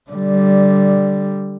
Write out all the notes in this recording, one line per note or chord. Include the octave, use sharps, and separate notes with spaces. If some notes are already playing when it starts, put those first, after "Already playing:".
D3 G3